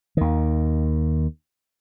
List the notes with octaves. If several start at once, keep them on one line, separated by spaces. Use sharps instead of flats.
D#2 D#3